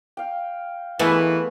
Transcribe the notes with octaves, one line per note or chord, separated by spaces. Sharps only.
F5 G5
E3 A3 B3 G#4 A#4 D#5